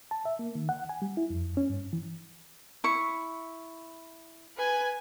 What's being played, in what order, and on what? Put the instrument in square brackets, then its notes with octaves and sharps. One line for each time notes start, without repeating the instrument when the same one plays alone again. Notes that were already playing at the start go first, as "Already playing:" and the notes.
[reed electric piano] A5
E5
A#3
D#3
F#5
G#5
G3
E4
F2
C#4
G2
E3
[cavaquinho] E4 C#6
[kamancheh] B4 G#5